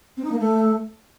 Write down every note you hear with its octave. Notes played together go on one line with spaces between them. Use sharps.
C4
D#4
A#3
A3